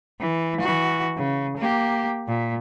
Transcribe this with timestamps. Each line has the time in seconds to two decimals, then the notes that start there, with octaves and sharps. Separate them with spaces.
0.20 E3
0.61 E3 F#4
1.17 C#3
1.57 A#3 G4
2.28 A#2